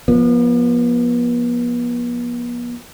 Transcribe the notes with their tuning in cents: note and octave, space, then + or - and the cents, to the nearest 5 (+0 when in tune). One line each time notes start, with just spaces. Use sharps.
F3 +0 B3 -40